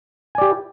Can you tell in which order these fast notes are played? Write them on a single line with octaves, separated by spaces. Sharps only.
G#5 D5 G4